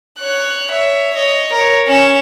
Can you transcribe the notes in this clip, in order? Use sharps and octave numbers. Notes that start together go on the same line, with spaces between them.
C#5 F#6
C#5 E5
C#5 D#5
A#4 C#5
C#4 E7